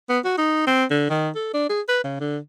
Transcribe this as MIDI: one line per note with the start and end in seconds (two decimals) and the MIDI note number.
0.09 0.19 59
0.24 0.35 66
0.38 0.64 63
0.67 0.85 60
0.90 1.06 50
1.10 1.30 51
1.35 1.53 69
1.54 1.69 62
1.69 1.81 68
1.89 2.00 71
2.04 2.18 49
2.20 2.38 50